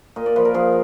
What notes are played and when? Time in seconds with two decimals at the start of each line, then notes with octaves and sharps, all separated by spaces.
0.16 A#2 D#5
0.26 D5
0.36 F3 B4
0.45 A#4
0.54 F3 G#4